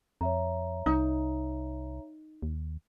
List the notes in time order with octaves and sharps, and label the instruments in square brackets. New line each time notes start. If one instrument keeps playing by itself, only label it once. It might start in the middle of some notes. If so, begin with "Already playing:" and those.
[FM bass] F2 [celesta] C#5 E5 A#5
[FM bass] C2 [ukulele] D#4
[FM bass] D#2